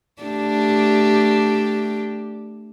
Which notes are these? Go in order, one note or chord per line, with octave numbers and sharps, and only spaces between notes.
A3 D4 G4